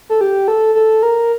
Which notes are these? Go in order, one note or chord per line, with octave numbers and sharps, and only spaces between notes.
A4
G4
A4
A4
A#4